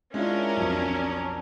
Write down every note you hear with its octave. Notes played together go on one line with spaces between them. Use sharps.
G#3 C#4 D4 E4 F4 A#4
B1 F2